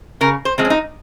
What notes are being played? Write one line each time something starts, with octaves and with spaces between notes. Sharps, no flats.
C#3 A#4
C5
F3 G#3 C4
C#4
D#4